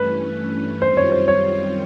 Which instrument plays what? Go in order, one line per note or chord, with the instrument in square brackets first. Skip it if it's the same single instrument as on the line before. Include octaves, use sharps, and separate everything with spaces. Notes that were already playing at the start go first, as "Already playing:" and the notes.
Already playing: [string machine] G2 E3 A3 C#4 [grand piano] B4
[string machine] F#2 D#3 G3 C4 F4 [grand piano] C5
[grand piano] C#5
C5
C#5